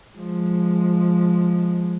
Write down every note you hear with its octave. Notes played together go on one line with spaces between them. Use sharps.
F3 G#3